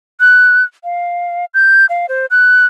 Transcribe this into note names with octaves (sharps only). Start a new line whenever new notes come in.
F#6
F5
G6
F5
C5
F#6